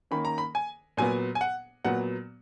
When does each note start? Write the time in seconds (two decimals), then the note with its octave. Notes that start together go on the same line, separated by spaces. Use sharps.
0.11 D#3 A#3 C#4 B5
0.25 A#5
0.38 B5
0.55 G#5
0.97 A#2 F#3 B3 G#5
1.35 G#5
1.41 F#5
1.85 A#2 F#3 B3 F#5